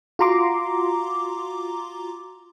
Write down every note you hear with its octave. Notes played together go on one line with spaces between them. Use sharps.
F4 F#4 A#5 C6 D6